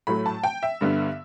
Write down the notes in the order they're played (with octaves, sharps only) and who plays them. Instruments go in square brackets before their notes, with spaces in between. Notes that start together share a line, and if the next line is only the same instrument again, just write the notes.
[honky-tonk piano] A2 F#3 A3 B5
A5
G5
E5
G2 D3 G3 B3